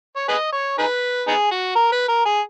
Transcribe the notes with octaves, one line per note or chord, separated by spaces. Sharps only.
C#5
G#4 B4 D#5
C#5
D#4 G#4 B4
B3 D#4 G#4
F#4
A#4
B4
A#4
G#4